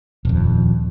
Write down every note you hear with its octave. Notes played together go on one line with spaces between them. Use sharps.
D#1 F2